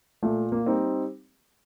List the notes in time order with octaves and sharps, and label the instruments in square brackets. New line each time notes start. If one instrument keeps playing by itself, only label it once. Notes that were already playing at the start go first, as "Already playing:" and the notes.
[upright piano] A#2 [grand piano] A3
[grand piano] A#3
[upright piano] G3 C4 D#4